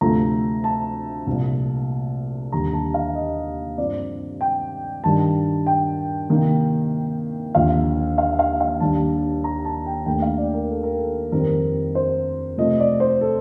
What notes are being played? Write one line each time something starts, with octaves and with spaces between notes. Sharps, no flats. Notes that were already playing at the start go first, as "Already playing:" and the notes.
D2 C3 F3 A3 A#5
A5
C2 A#2 F3
D#2 D3 G3 A#5
A5
F5
D#5
G2 F3 C4 D5
G5
G2 D#3 G3 A5
G5
C3 D#3 A#3
D#2 D3 F3 F5
F5
F5
F5
D#2 D#3 G3 D4 A5
A#5
A5
G5
D#2 D#3 A3 D4 G5
F5
D5
A#4
A4
A#4
A4
F2 D#3 G3 C4 A#4
C5
C3 F3 A3 C4 D#5
D5
C5
A4